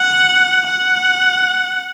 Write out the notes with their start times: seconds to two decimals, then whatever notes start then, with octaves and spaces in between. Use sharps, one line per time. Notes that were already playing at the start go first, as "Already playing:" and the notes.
Already playing: F#5
0.66 F#5